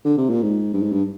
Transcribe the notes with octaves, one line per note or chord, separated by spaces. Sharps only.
D3
C3
A#2
G#2
G2
G#2
G2